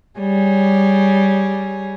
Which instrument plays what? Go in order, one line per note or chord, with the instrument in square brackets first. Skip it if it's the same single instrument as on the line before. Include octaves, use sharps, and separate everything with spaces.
[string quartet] G3 G#4 C#5